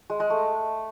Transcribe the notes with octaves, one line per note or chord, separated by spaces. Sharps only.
G#3
G#3
A3